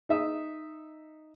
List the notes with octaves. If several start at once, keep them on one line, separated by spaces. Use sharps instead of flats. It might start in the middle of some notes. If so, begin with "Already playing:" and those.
D#4 E5 D#6